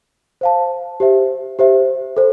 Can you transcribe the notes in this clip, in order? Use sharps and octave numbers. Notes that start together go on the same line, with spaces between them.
C5 F5 A5
G4 C5 E5
G4 C5 E5
A4 C5